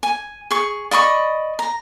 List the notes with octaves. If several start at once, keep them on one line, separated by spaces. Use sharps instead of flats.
G#5
G#4 C#6
D5 D#5 B5 C#6
A#5